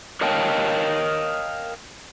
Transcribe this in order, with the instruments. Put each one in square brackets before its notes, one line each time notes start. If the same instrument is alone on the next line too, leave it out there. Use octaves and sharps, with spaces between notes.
[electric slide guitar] A#4 C#5 D#5 F5 G5 A5